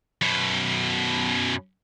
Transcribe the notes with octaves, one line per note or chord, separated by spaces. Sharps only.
F#2 B2